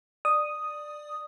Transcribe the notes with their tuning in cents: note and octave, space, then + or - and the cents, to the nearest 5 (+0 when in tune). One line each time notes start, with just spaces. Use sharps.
D5 +15 D#6 +0